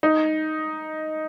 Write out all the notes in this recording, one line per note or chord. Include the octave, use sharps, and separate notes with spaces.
D#4